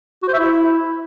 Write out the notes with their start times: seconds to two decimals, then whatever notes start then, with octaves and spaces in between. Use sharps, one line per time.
0.23 F#4
0.28 C5
0.34 E5
0.39 E4